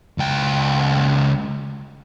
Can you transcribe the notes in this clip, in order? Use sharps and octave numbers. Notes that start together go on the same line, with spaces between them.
C#2 G5